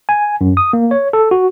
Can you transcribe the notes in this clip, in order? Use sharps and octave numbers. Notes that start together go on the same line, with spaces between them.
G#5
F#2
D#6
A#3
C#5
A4
F#4